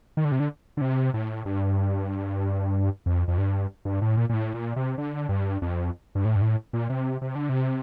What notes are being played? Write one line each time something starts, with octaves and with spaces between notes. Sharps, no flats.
D#3
D3
C3
D3
D3
C3
A2
G2
F2
F2
G2
G2
A2
A#2
A#2
A2
A#2
C3
D3
G2
F2
G2
A2
G2
A2
A#2
C3
C3
D3
C3